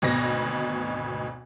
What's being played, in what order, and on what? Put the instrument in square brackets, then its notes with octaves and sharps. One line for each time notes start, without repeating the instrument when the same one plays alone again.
[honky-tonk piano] G#1 D2 B2 A#6